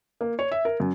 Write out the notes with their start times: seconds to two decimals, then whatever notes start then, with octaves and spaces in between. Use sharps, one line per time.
0.21 A#3
0.39 C#5
0.52 E5
0.65 A#4
0.80 F#2